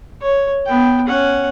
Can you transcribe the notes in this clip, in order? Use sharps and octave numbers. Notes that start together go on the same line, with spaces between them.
C#5
B3 G5
C#4 F#5